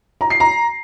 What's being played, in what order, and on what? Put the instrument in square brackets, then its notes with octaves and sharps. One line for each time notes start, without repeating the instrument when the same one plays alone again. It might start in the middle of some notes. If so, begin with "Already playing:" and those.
[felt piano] A#5
C7
A#5